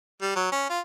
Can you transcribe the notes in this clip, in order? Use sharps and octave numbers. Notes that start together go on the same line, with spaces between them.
G3
F#3
C#4
F4